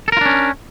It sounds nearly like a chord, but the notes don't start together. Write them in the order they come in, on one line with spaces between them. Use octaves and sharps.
A4 A#4 F4 D4 C#4